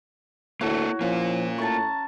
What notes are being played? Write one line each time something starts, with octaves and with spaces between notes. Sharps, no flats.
D2 A#3 E4 F#4 A4 C#5 G#6
F3 A#3 C#4 F4
A2 E5 A5 A#5 C#6 A6